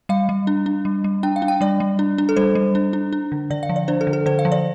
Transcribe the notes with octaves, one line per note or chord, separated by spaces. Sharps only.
G3 F5
G3
D4
D4
G3
G3
D4 G5
F5
D4
G5
G3 D5
G3
D4
D4
A4
G3 C5
G3
D4
D4
D4
D3
D3 D5
F5
F3
D5
D4 C5
A4
D3
A4
D3 C5
F5
F3
D5